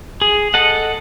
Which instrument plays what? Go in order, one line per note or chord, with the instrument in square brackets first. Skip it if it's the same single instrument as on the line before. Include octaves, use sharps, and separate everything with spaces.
[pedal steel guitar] G#4
A4 D#5 F#5